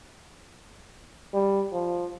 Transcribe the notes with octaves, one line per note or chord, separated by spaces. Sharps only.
G3
F3